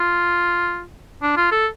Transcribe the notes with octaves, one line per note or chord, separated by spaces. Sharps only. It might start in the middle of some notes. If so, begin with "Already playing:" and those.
Already playing: F4
D4
F4
A4